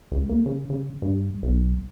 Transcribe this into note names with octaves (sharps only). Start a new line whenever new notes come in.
C#2
A#3
C#3
C#3
G2
B1